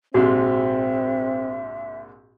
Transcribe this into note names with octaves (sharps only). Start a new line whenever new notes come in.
A#1 G#2 C3 C4 F#4 E5